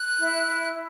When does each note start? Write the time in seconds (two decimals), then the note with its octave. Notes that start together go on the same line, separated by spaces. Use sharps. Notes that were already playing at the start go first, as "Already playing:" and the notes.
Already playing: F#6
0.18 E4
0.45 E4
0.73 E4